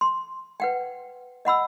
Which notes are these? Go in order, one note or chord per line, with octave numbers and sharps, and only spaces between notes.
C6
B4 F#5 G5
D#5 F#5 B5 E6